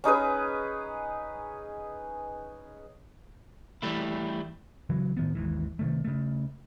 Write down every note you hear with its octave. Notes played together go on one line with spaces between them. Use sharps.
C#4 D#4 G#4 B4
E3 G3 A3 E4
C#3 E3 F#3
A2 D#3 B3
G#1 D#2 G#2 E3
C3 D#3 A3
C#3 A3